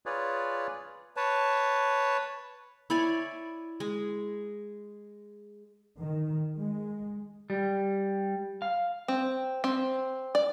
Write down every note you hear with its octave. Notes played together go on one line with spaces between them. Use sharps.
F4 G#4 B4 C#5 D5
B4 C#5 A5
E4 C#5 D5 G#5
G#3
D#3
G#3
G3
F5
C4
C4
D5